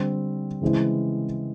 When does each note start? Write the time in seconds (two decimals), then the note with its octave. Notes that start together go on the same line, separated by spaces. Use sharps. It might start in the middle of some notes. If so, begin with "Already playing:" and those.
Already playing: D3 G3 C4
0.61 C#3 E3 G#3 C4 E4